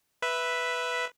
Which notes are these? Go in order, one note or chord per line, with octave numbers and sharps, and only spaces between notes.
B4 E5